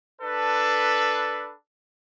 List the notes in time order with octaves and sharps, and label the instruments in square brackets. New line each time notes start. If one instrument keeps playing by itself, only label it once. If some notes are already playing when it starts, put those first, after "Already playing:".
[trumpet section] D4 A4 B4